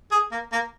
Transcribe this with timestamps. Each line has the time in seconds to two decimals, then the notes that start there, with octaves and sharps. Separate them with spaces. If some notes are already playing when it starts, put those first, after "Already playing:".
0.11 G#4
0.32 A#3
0.52 A#3